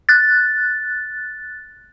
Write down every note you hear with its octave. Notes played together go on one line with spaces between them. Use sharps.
F#6 A6